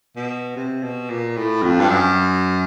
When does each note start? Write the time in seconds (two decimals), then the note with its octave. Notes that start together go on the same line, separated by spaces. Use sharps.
0.16 B2
0.56 C3
0.83 B2
1.10 A#2
1.36 A2
1.63 F2
1.80 G2
1.89 F#2